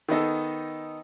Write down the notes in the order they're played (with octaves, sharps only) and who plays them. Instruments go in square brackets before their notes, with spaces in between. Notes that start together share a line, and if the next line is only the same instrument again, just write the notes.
[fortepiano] D#3 B3 D#4 A4